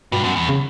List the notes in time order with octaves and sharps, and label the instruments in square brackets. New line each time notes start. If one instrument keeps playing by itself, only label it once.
[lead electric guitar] G2 [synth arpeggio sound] B2
[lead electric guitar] F#2
E2
[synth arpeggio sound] C#3